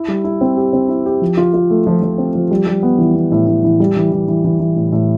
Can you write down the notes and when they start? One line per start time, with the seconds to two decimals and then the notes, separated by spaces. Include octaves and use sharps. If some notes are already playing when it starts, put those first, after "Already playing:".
Already playing: E4
0.08 G3
0.24 E4
0.41 C4
0.57 G4
0.73 C4
0.89 E4
1.06 G4
1.22 F3
1.37 F4
1.54 F4
1.70 A3
1.87 F3
2.02 F3
2.18 C4
2.35 F3
2.51 G3
2.67 G3
2.83 B3
2.98 E3
3.15 B3
3.32 A2
3.47 A2
3.64 E3
3.80 G3
3.96 E3
4.12 E3
4.28 E3
4.44 E3
4.60 E3
4.76 A2
4.92 A2